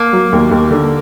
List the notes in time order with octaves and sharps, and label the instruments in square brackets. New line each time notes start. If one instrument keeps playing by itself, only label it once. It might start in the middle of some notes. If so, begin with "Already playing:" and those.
Already playing: [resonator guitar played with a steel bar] A#3
[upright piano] F#3
D#2
D#2
D3